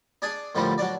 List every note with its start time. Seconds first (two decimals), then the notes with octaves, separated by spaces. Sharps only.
0.22 D4 G#4 D5 G#5
0.55 A2 D3 F3 G3 A3 A#3
0.78 F#3 D4 D5